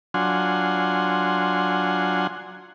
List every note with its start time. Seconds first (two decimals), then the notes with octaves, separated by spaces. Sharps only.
0.14 F#3 D4 F4 F#5 G#5 C6